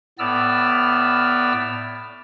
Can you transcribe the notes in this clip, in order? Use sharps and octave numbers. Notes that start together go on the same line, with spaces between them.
A2 B3 D5 E6 F6